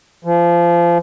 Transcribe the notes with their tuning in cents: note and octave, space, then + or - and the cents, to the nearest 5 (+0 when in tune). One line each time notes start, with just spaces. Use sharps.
F3 -25